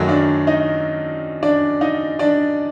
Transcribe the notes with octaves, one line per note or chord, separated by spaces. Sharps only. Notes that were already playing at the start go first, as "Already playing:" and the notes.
Already playing: F#2 D#3 F#3 A3
D4 D5
D#4 D#5
D4 D5
D#4 D#5
D4 D5